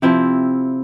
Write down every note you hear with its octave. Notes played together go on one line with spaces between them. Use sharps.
C3 F3 C4 E4